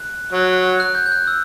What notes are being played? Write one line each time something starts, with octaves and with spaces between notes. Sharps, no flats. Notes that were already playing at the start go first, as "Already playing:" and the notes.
Already playing: F#6
F#3
F#6
G6
G6
F#6
E6